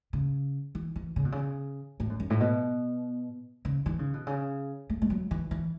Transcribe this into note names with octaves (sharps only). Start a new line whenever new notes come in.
C#3
E3
E3
C#3
B2
C#3
A2
F#2
F#2
A2
B2
C#3
E3
C#3
B2
C#3
A3
A3
F#3
E3
E3